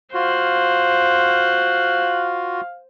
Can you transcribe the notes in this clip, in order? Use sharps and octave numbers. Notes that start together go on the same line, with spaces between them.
F4 F#4 C5 F5 F#6